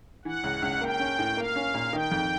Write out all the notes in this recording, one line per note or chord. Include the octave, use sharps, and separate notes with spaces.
E3 F#5
C#2
C#2
A#3 G5
C#4
A2
A#3 F5
C#4
A#2
D#3 G5
F2